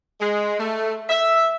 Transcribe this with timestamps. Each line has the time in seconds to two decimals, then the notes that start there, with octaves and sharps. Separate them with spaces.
0.20 G#3
0.59 A3
1.09 E5